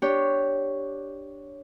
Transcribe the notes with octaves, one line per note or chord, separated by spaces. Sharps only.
D4 G4 C#5